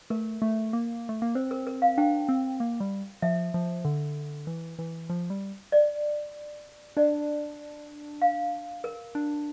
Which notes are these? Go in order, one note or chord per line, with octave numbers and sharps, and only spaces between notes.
A3 A#4
A3
A#3
A3
A#3
C4 C5
A#4
A#4
F5
D4 G5
C4
A#3
G3
F3 E5
F3
D3
E3
E3
F3
G3
D5
D4 D5
F5
A#4
D4